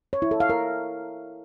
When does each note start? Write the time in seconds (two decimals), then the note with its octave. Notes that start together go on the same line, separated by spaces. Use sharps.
0.13 C#5
0.22 E4
0.31 A4
0.40 F5
0.50 A#4